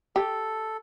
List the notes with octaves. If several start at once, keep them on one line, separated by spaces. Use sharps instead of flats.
G4 A4